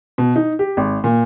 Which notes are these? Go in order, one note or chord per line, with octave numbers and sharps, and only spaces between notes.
B2
D#4
G4
G#1
A#2